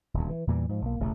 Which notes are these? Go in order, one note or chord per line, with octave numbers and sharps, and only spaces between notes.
D#1 D2
E3
E2 A#2 E3 G3
G#2 F3
B1 A#3
E1 A1 C#3 A3